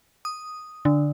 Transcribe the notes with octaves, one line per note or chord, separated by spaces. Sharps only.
D#6
D3